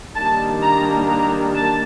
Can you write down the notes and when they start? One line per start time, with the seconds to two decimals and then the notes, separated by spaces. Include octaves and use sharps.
0.15 D#3 G3 A#3 D4 A5
0.61 A#5
1.07 A#5
1.54 A5